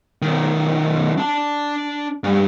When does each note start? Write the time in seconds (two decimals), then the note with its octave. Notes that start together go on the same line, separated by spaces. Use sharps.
0.22 B1 D#3
1.18 D4 A5
2.24 G2